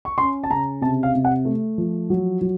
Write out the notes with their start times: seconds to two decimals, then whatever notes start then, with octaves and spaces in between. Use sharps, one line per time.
0.05 C#6
0.18 C#4 C6
0.44 A5
0.50 C#3 A#5
0.81 C3 A5
1.03 F5
1.14 C3
1.25 F#5
1.45 A3
1.78 F3
2.10 F#3
2.41 F#3